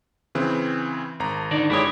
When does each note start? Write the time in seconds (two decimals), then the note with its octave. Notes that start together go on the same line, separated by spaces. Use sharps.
0.35 C#3 E3 C4
1.20 G#1 A#5
1.51 D3 D#4 D5
1.70 G1 G#3 E4 G4 C#5 D#6